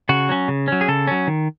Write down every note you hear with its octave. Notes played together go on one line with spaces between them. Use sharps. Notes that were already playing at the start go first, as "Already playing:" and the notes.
C#3 F#4
F#3 C#4
C#3
F#3 C#4
G#4
C#3 A4
F#3 C#4
D#3